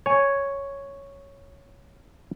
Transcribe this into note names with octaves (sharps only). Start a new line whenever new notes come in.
C#5 G#5